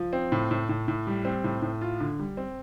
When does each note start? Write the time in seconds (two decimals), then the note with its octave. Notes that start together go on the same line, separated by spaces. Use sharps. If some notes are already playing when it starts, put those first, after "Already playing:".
Already playing: F3
0.13 C4
0.32 A2
0.51 A2
0.69 A2
0.88 A2
1.07 G3
1.25 C4
1.44 A2
1.62 A2
1.81 F4
2.00 D3
2.19 G3
2.37 C4